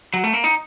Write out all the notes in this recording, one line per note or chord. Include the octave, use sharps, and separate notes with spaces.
F#3
A3
A#3
D#4